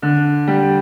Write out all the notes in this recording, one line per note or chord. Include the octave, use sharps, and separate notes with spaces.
D3
G3